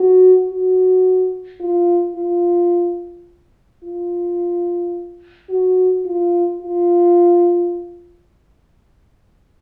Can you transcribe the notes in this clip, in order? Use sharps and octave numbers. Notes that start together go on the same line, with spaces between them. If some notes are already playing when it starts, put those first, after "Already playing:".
Already playing: F#4
F#4
F4
F4
F4
F#4
F4
F4